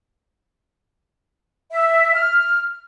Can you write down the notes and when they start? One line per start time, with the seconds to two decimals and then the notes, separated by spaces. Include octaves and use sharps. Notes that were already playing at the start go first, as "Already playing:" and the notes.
1.72 E5
2.15 F6